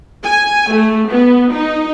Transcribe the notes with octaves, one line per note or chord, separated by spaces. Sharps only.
G#5
A3
B3
D#4